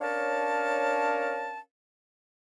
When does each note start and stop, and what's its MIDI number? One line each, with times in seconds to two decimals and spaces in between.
0.01 1.59 61
0.01 1.59 62
0.01 1.59 70
0.01 1.59 73
0.01 1.59 77
0.01 1.59 81